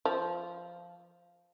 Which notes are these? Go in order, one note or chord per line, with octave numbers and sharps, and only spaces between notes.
F3